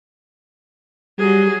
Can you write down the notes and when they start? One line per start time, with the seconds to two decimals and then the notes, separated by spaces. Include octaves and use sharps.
1.19 F#3 G3 G#4